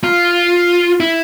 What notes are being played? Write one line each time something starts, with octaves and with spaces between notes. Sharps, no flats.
F4
E4